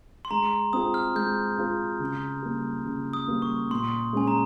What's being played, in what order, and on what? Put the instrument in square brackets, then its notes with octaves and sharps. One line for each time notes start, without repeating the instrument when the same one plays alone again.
[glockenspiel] C6
[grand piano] G#3 [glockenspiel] A#5
[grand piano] C4 F4 G#4 [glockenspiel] D#6
[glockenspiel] F6
[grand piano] G#3 [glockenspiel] G6
[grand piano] C4 F4 G#4
C#3
G3 A#3
C#3
[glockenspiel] D#6
[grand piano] G3 A#3
[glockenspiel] C#6
[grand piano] A#2 [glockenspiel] C6
[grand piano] G#3 C#4 [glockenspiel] G#5
[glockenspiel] A#5